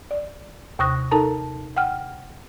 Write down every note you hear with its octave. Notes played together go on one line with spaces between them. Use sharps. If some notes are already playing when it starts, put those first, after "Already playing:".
D5
D#2 C3 C#6 D#6 F#6 A#6
D#4 A4 A#4 A5 A#5
F#5 G5 F6